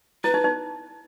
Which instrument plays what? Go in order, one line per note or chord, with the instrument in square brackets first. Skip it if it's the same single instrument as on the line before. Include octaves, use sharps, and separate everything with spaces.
[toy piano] E4 [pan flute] B4
[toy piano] D#4
D#4